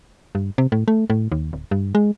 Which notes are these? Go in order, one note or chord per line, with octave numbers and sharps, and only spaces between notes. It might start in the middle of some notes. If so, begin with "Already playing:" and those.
G2
C3
A2
A3
A2
D#2
D1
G2
G#3